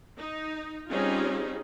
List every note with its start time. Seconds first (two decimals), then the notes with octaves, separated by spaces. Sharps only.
0.17 D#4
0.90 G3 C4 C#4 D#4 F4 G#4